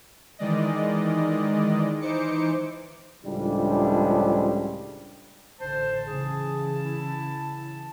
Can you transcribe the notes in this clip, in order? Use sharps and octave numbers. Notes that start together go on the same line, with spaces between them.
D#3 E3 G#3 D5 D#5
E3 D#4 C5 D6 C#7
C#2 A2 F3 G3 D4
A1 D3 C5 A5
C#3 E3 G#4
E4